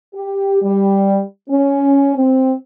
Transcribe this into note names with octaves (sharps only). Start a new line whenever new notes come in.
G4
G3
C#4
C4